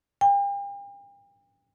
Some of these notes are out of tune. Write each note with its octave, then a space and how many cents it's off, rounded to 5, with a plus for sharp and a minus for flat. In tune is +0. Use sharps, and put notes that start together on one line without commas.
G5 +40